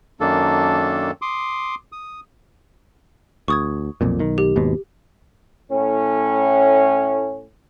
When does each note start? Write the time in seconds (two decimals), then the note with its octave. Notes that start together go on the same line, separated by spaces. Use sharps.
0.20 F#2 D#3 A#3 D4 A4
1.22 C6 D6 D#6
1.92 D#6
3.48 D2 C#6 D#6 G#6
4.01 B1 F2 A#2
4.19 B1 D#3
4.38 G4
4.56 G#1 D#2 B2
5.72 A2 C#4